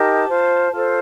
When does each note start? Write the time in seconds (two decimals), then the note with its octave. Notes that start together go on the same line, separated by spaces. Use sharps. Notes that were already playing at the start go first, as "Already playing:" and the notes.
Already playing: D#4 G4 A#4 A5
0.29 F4 C5
0.72 F4 A4 C5